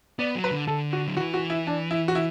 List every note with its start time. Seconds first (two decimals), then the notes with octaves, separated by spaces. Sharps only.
0.19 B3 D5
0.35 F#3
0.44 B4
0.51 D3
0.67 D3 A4
0.93 F#4
1.07 F#3
1.17 E3 F#4
1.34 F#4
1.50 E4
1.67 D4
1.91 E4
2.08 F#4
2.15 E4